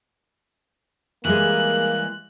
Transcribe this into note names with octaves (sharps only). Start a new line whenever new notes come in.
E3 G3 G#3 A#3 F#6